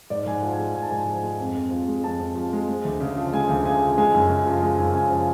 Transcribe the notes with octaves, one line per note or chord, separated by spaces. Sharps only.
G#2 D5
G#2 G#5
F#5
F3
G#5
G#3
G#2 G#5
A5
G#2 G#5
F3
G#3
F2
F2
F3
G#3
F2 A5
F2
F3
G#3
G#3
D2
C#3
F3
G#3 G#5
D2
C#3 G#5
F3
G#3 G#5
F#2
C#3
F3
G#3
F#2
C#3 G#5
F3